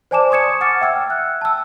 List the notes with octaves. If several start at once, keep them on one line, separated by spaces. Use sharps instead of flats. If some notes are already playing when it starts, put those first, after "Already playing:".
C5 D5 G#5 A5 D6 E7
C6 C#6 D#6 G#6 C#7 E7
F#5 D6 F6 A6 C#7
E5 G5 E6 F6 G#6
F#6
A5 E6